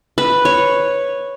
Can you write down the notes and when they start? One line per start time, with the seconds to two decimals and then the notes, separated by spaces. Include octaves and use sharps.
0.18 B4
0.45 C#5